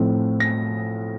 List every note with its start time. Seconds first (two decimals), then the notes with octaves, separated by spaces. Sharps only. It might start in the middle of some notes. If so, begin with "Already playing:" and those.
Already playing: A2 F3 C4
0.40 A#6